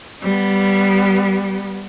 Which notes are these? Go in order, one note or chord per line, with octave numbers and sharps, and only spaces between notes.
G3 B3